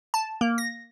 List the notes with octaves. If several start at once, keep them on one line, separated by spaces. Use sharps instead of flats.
A5
A#3
A#6